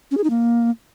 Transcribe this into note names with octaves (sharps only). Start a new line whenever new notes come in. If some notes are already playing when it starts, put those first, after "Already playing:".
C#4
G#4
D#4
A#3